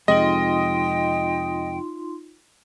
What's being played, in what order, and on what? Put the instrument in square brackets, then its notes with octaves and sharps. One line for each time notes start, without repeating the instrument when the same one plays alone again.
[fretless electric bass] F2 C3 G#3 [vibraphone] D#4 F4 C6 [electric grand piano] D#5 [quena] G5